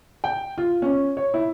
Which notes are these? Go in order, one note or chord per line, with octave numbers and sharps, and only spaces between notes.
G5
F4
C#4
C#5
E4